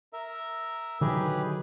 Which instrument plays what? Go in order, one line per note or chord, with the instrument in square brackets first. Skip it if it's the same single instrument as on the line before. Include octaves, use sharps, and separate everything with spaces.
[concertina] A#4 E5
[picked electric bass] D3 D#3 F#3 [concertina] G4 G#4 B4